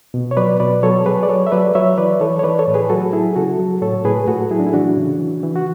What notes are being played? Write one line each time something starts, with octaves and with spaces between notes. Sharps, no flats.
B2
C#5
F#3 B4 D5
B2 B4 D5
F#3 A4 C#5
F#3 G#4 B4
D5
F#3 A4 C#5
E5
F#3 B4 D5
F#3 C#5 E5
E3 B4 D5
E3 A4 C#5
C#5
E3 B4 D5
A4 C#5
A2
G#4 B4
F#3 F#4 A4
F#3 E4 G#4
C#3 F#4 A4
F#3
A2 A4 C#5
A2 G#4 B4
A2 F#4 A4
F#3 E4 G#4
D4
E4
E3 D4 F#4
C#3
E3
E3
F#4